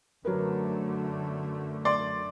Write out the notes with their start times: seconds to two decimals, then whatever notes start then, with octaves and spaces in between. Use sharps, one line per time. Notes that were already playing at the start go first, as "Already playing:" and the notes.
0.25 F#2 D3 F#3 A3 A#4 B4
1.85 D5 C6